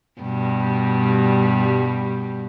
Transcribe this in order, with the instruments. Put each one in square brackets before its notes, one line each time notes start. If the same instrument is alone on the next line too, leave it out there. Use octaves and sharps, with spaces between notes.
[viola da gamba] G2 B2 G3